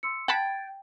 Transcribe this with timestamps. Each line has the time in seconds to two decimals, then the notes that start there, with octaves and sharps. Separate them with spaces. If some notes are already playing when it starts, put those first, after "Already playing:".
0.03 C6 E6 C#7
0.28 F#5 G5 A5 B5 G#6 A6